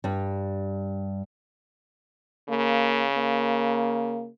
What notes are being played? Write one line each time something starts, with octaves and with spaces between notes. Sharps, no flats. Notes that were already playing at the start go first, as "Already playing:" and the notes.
G2 G3
C#3 A#3
A#3